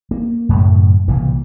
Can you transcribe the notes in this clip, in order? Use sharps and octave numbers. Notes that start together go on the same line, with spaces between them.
A#3
F#2 A2 C#3
C2 A#2 C#3 E3